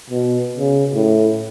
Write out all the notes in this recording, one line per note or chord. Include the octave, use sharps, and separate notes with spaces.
B2
C#3
A2